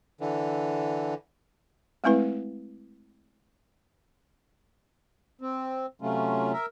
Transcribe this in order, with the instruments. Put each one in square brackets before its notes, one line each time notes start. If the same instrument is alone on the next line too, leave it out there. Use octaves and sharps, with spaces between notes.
[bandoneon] D3 E3
[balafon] G#3 A3 C4 E4 B4
[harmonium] C4
C3 F#3 A3 C#4 F4
A#4 E5